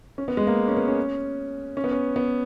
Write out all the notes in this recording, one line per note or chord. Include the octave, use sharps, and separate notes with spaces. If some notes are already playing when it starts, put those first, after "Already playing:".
C#4
B3
G#3
A#3
C#4
B3
C#4
C#4
B3
C#4
B3